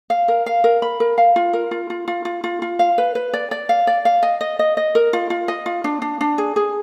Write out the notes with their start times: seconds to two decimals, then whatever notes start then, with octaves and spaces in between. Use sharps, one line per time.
0.10 F5
0.28 A#4
0.46 F5
0.64 A#4
0.82 B5
1.00 A#4
1.18 F5
1.36 F4
1.53 A#4
1.71 F4
1.90 F4
2.08 F4
2.25 F4
2.44 F4
2.62 F4
2.79 F5
2.98 B4
3.15 B4
3.33 D5
3.51 D5
3.69 F5
3.87 D5
4.05 F5
4.23 D#5
4.41 D#5
4.59 D#5
4.77 D#5
4.95 A#4
5.13 F4
5.30 F4
5.48 D#5
5.66 F4
5.84 D4
6.02 D4
6.21 D4
6.38 G#4
6.56 G#4